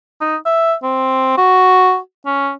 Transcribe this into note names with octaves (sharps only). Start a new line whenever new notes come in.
D#4
E5
C4
F#4
C#4